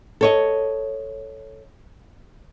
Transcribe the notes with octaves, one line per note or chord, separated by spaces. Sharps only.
A4 C#5 D#5